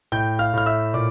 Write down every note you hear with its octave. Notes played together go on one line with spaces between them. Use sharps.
A2 G5 G6
F5 F6
A2 F6
E5 E6
A#2 D5 D6